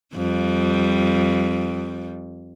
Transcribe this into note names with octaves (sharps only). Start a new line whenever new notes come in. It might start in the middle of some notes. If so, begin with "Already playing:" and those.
F2 G3